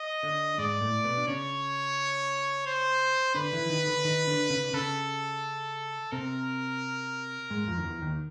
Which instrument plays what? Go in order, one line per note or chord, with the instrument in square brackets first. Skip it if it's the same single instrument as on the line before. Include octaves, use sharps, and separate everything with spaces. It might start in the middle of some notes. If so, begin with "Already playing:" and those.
Already playing: [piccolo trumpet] D#5
[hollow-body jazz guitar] D3 D4
[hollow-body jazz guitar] G#2 G#3 [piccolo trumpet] D5
[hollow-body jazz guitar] A2 A3
B2 B3
D4
[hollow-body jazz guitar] C#3 C#4 [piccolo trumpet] C#5
[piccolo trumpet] C5
[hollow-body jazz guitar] D3 D4 [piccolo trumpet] B4
[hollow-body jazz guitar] E3 E4
D#3 D#4
D3 D4
D#3 D#4
D3 D4
C#3 C#4
D4
[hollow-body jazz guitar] C#3 C#4 [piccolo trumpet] A4
[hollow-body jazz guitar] C3 C4 [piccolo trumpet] A#4
[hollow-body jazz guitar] G#2 G#3
F2 F3
D#3
E2 E3
D#2 D#3